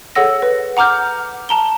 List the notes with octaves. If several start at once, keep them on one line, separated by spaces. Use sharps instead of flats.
G#4 A4 C#5 F#5 E6 A#6
B4
F#5 A#5 D6 F6 G6
A5 A#5 G7